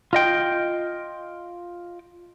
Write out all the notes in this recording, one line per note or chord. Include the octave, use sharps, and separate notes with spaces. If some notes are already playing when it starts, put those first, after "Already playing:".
F4 D#5 G5